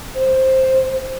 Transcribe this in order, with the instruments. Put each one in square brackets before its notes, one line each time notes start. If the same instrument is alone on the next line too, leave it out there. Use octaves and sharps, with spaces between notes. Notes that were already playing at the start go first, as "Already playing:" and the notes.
[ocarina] C5